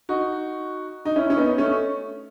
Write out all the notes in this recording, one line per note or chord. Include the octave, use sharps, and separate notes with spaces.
D#4 F#4
D#4
C#4 E4
C#4
B3 D#4
A3 C#4